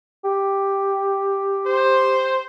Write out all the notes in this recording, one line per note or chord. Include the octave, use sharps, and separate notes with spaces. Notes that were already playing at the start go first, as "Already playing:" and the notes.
G4
C5